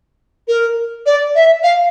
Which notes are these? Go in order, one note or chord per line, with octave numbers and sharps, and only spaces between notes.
A#4
D5
E5
F5